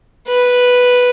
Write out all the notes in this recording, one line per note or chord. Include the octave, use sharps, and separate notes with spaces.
B4